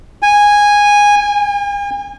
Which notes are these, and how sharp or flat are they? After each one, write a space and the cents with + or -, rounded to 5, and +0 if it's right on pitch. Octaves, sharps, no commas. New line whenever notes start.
G#5 -10
G#5 -45